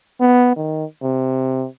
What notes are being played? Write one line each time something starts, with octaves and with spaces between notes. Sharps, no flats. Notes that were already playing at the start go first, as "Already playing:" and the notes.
B3
D#3
C3